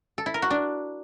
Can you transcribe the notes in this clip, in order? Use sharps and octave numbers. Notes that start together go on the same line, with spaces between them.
A4
E4
A#4
F#4
D4